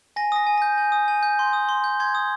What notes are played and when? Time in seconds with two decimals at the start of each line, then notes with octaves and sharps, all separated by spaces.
0.16 G#5 A#6
0.32 D#6 A#6
0.47 G#5
0.58 G6 A#6
0.78 G#5
0.92 D#6
1.08 G#5
1.23 G6
1.39 C6
1.53 D#6
1.69 C6
1.84 G6
2.00 C6 G#6
2.15 D#6